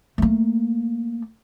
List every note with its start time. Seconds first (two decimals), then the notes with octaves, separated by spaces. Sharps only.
0.18 A3 A#3